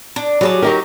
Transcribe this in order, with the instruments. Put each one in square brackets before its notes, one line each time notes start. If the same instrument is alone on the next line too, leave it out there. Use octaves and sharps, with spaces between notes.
[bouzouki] D4
[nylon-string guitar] F#3 [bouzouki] G3 G#4 A5
[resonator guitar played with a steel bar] F#3 D#4 G4 [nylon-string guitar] A#4